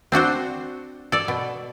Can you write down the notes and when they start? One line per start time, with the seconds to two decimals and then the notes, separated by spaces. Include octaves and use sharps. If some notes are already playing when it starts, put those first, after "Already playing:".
0.12 C4 D4 F#4 C5
1.12 A4 D5
1.28 B2